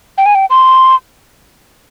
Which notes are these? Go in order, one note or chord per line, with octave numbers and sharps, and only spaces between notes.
G5
G#5
G5
C6